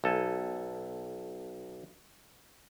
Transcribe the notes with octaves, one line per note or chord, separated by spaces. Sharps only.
B1 A4 G#5